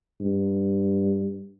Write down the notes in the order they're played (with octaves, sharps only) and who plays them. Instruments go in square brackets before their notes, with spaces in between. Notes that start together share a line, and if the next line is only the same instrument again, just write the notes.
[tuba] G2